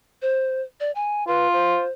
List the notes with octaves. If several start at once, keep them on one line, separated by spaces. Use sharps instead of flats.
C5
D5
G#5
F4 B4
C5